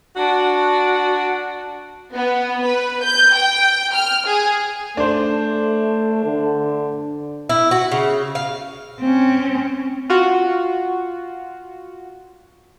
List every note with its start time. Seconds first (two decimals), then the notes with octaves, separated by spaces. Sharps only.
0.16 D4 F#4
2.15 B3
2.64 B4
3.04 G6
3.35 G5
3.94 F6
4.27 G#4
4.97 A3 D4 C5
6.25 D3
7.49 E4
7.71 F#4
7.91 C#3
8.35 F5
9.01 C4 C#4
10.10 F4 F#4